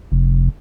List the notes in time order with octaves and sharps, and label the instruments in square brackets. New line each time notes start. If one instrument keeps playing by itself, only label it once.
[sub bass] F1